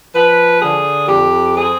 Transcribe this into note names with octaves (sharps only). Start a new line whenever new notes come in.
F3 B4
D3 G#4
F2 G4
C4 G#4